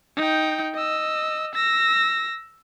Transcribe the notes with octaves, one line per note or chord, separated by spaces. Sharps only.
D#4 G5
D#5 E6
E6 A#6